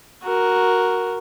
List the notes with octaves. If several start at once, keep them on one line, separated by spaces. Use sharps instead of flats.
F#4 A#4